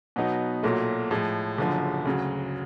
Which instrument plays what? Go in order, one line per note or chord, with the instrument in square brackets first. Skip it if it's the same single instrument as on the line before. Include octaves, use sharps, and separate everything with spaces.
[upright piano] B2 F#3 B3 D#4 F#4
B1 A#2 F#3 A3
A2 F3 G#3
F#1 F#2 D3 F3
D2 C#3 F#3